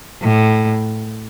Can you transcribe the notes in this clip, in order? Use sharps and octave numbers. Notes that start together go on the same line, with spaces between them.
A2